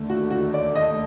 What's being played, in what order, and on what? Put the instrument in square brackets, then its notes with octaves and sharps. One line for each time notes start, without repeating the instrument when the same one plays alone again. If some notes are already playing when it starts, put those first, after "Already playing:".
Already playing: [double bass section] D#2 D3 A3
[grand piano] F#4
F#4
D5
D#5